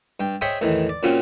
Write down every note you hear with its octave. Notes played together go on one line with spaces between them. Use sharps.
G2 G5
G#4 C5 C#5 D#5 E5 G5
E2 A2 D#3 E3
D5
A#2 C#3 C4 C#4 F4 F#4